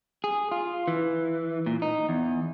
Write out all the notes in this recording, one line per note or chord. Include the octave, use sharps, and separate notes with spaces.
G#4
F4
E3
A#2
D#4
E2